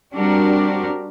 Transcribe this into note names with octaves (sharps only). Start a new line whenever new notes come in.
G3 C4 D4 F#4 G4 A#4